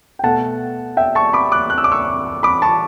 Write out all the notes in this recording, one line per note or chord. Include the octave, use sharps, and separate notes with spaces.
G5
B2 A3 F#5 A5
E5 G5
A5 C#6
B5 D6
D6 F#6
F#6
E6
D6
C#6 E6
B5 D6
A5 C#6